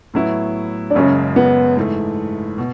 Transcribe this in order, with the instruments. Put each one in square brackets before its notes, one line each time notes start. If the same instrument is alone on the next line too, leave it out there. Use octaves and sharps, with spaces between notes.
[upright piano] A2 F#3 B3 E4
[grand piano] D4
[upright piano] F#1 F#2 C#3 G#3 [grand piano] C#4
[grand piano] B3
[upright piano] G#2 E3 A3
B2